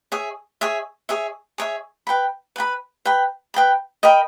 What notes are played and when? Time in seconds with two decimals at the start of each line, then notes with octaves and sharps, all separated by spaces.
0.12 G#4 C#5 E5
0.61 G#4 C#5 E5
1.09 G#4 C#5 E5
1.58 G#4 C#5 E5
2.07 B4 G5 B5
2.56 B4 G5 B5
3.05 B4 G5 B5
3.54 B4 G5 B5
4.03 A#4 D#5 G5 B5